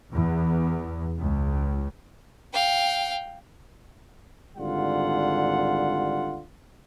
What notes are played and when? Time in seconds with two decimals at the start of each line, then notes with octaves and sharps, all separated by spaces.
0.13 E2
1.20 C#2
2.53 F5 G5
4.58 G#1 D3 G3 F4 F#5